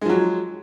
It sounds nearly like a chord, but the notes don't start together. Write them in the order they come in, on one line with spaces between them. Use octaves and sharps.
G#3 F3 F#3